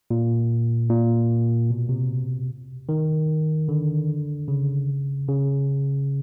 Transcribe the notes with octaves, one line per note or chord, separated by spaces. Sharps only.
A#2
A#2
B2
C3
D#3
D3
C#3
C#3